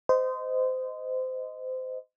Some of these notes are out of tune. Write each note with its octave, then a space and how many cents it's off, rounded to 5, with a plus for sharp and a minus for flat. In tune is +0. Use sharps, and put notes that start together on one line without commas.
C5 -25 D#5 +0